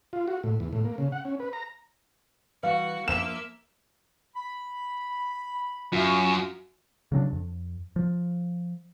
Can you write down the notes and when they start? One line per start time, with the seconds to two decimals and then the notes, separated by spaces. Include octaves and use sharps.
0.13 F4
0.28 F#4
0.44 A2
0.60 E2
0.73 A2
0.85 A#3
0.98 C#3
1.12 F#5
1.25 C#4
1.40 B4
1.53 A#5
2.63 E3 G3 F#4 B4 F5
3.08 F3 A#3 E5 E7
4.36 B5
5.92 F#2 F4 F#4 E5
7.12 C#3 F#3 C4 D4
7.33 F2
7.96 F3